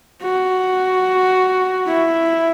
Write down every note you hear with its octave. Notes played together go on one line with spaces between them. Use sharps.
F#4
E4